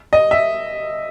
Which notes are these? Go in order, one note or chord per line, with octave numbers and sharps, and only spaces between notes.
D#5
E5